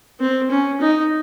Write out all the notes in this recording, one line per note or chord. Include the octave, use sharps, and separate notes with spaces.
C4
C#4
D#4